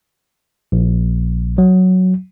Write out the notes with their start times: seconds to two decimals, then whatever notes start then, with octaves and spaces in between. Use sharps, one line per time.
0.72 A#1
1.58 F#3